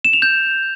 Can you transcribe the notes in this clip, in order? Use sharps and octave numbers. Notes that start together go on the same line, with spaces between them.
E7
F7
G6